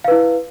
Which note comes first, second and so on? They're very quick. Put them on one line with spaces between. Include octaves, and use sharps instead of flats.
F5 B4 E4